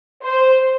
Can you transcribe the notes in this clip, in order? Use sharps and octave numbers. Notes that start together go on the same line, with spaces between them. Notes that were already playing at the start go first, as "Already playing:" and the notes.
C5